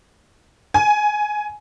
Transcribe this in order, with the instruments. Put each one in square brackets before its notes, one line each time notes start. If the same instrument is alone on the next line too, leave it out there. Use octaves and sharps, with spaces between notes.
[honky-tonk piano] G#5